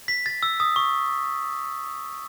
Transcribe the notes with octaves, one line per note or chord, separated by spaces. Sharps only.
B6
A6
E6
D#6
C#6